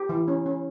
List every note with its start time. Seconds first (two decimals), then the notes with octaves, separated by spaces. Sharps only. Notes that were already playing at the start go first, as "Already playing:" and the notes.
Already playing: G4
0.09 E3
0.28 C#4
0.46 C#4